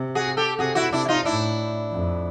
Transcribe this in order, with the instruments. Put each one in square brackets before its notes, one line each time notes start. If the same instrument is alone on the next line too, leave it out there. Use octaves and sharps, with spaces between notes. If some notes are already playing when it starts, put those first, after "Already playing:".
Already playing: [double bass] C3
[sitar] F#4 G#4
G4 A4
[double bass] C3 [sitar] F#4 G#4
[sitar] E4 F#4
[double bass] C3 [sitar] D4 E4
[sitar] E4
D#4 F4
[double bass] A2 [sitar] D4 E4
[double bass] F2